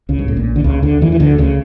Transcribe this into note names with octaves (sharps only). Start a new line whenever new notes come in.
C#2 C#3
G2
A2
A#1 A#2
D3
C#2 C#3
D2 D3
E2 E3
E3
D2 D3
C#2 C#3